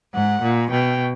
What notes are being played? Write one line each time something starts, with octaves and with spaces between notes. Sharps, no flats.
G#2 F#5
A#2
B2 G5